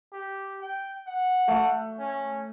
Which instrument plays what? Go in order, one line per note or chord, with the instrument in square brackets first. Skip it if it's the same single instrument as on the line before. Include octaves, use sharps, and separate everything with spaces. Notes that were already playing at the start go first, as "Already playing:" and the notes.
[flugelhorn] G4
G5
F#5
[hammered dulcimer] A3
[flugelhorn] C#4